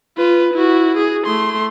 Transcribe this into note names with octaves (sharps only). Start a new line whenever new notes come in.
F4 B4
E4 F#4
G#4
A3 C6